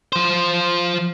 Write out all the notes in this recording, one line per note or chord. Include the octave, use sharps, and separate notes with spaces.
F3 C5